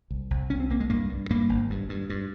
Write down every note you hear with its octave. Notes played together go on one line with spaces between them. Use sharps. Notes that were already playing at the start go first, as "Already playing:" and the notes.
C2
C2
C2 C#4
C4
C2 A#3
G#3
G2 A#3
G2
G2 A#3
G#1
G2
G2
G2